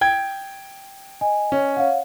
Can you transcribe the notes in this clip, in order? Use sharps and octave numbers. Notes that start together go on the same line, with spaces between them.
G5 G#6
D#5 G#5
C#4
C#5 F5 F#5